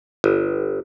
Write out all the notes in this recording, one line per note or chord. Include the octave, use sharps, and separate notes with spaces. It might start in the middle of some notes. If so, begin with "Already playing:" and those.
G1